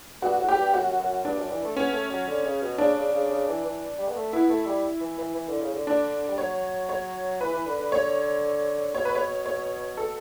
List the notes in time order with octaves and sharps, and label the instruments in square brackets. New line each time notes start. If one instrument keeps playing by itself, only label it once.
[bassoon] G2 [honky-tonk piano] F#4
[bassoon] A2
[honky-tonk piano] G4
[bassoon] G2
[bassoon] F#2 [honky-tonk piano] F#4
[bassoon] F#2
[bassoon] G2 [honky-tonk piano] D4
[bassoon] F#2
E3
A3
[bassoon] B3 [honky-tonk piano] C#4
[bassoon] A3
F#3
D3
C#3
B2
[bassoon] C#3 [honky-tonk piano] D4
[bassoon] C#3
C#3
C#3
E3
E3
G3
B3
A3
[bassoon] B3 [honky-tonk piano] E4
[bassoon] A3
G3
E3
E3
E3
D3
C#3
D3
[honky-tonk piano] D4
[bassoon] G3
[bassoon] F#3 [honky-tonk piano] C#5
[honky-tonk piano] C#5
[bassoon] E3 [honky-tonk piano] B4
[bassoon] E3
D3
D3
[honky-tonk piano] C#5
[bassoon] B2 [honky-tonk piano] C#5
[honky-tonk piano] B4
C#5
C#5
A4